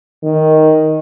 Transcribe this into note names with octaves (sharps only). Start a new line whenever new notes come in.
D#3